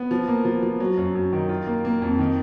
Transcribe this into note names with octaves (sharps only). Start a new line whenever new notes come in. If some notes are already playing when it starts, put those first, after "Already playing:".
Already playing: B3
F3
A#3
F3
F3
F#3
F#2
F#2
D#3
F4
A#3
A#3
F2
D#3